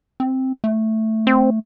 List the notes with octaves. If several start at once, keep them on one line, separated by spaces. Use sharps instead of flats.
C4
A3
C4